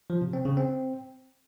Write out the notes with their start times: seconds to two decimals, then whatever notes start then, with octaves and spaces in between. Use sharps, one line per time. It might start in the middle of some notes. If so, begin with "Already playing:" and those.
0.10 F3
0.22 C3
0.33 C4
0.45 C#3
0.57 C4